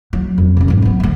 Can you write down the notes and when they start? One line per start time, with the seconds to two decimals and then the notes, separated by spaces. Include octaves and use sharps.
0.13 F#3
0.38 F2
0.57 C3 C#4
0.68 G#2 F#3
0.82 A#3 B3
1.00 D3 A3